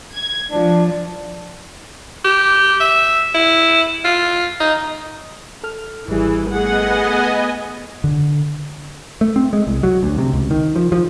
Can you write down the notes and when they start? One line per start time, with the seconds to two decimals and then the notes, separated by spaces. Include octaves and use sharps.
0.14 G#6
0.51 F3 D4
2.24 G4
2.80 E5
3.34 E4
4.05 F4
4.60 D#4
5.64 A4 F6
6.08 G#1 E3 G3 G#4
6.51 A3 B3 G#4 D#5 F#5 G#5
8.04 D3
9.21 A3
9.36 C4
9.53 G#3
9.67 C2
9.83 F#3
10.03 D2
10.18 C3
10.33 C#2
10.51 D#3
10.76 F3
10.92 F3